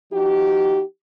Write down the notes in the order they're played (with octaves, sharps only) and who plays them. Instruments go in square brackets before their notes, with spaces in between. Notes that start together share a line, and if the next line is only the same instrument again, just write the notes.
[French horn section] F3 D#4 F#4 G4